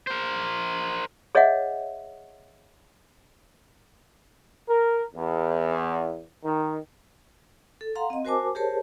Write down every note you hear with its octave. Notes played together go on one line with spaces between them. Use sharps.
A#4 C5
G#4 C#5 D#5 E5 F#5
A#4
E2
D#3
A4
F5 F#5 A#5 C6
C4 D#5
F#4 A#4 C5 G#5 A5 D6
G4 G#4 A#4 C5 C#5 A5